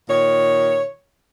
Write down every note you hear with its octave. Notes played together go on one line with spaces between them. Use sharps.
A#2 D#3 C#5